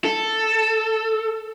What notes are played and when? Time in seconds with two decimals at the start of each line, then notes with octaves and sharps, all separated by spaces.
0.05 A4